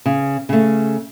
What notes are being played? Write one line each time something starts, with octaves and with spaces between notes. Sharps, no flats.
C#3
C#3 A3